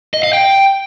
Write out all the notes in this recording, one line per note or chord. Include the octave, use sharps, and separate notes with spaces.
D#5
F5
G5